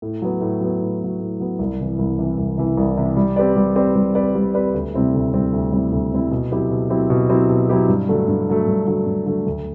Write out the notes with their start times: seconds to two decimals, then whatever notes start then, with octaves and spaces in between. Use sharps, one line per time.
0.02 A2
0.22 F#3 B3
0.41 A2
0.61 F#3 B3
0.81 A2
1.00 F#3 B3
1.20 A2
1.40 F#3 B3
1.59 C2
1.79 C3 E3
1.99 C2
2.19 C3 E3
2.38 C2
2.58 C3 E3
2.77 C2
2.97 C3 E3
3.17 G3
3.36 C4 G4 B4 D5
3.56 G3
3.76 C4 G4 B4 D5
3.96 G3
4.15 C4 G4 B4 D5
4.35 G3
4.54 C4 G4 B4 D5
4.74 D2
4.94 C3 G3 C4 E4
5.13 D2
5.33 C3 G3 C4 E4
5.53 D2
5.72 C3 G3 C4 E4
5.92 D2
6.12 C3 G3 C4 E4
6.31 B2
6.52 F#3 C4 E4 G4
6.70 B2
6.90 F#3 C4 E4 G4
7.10 B2
7.30 F#3 C4 E4 G4
7.50 B2
7.69 F#3 C4 E4 G4
7.88 G2
8.09 D3 F#3 A3
8.28 G2
8.48 D3 F#3 A3
8.67 G2
8.87 D3 F#3 A3
9.07 G2
9.26 D3 F#3 A3
9.46 D2